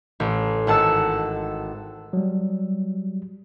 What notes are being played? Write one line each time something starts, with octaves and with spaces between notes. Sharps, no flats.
A1
G#1 F#5 A5 E6
F#3 G3